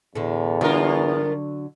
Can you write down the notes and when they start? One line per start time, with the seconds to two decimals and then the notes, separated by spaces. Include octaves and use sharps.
0.15 E2 A2 D3
0.61 G2 D3 F#3 D4 F4 A#4